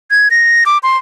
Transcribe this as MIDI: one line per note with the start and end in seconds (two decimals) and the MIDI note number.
0.11 0.28 92
0.31 0.64 94
0.66 0.78 86
0.83 0.97 84